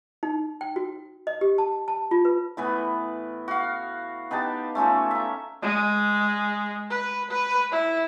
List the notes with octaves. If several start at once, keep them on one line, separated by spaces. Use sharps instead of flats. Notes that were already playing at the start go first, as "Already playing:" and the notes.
D#4
G5
F#4
D#5
G4
A5
A5
F4
B4
A2 E3 B3
F#4 F5
B3 D#4 G4 A5
A3 C#4 F4 A4
E5 A#5
G#3
B4
B4
E4